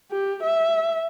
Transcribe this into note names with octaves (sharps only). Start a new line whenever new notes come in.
G4
E5